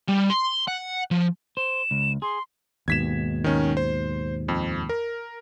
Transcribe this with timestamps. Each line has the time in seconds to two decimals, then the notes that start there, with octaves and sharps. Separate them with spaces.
0.08 G3
0.30 C6
0.68 F#5
1.11 F3
1.57 C5 E7
1.91 C#2
2.22 G#4 C6
2.88 D#2 G#2 B2 G#6 B6 E7
3.44 D#3 C#4
3.77 C5
4.48 F2
4.89 A#4